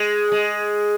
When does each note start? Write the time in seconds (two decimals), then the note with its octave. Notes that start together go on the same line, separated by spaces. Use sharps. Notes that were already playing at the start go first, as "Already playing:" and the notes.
Already playing: G#3
0.32 G#3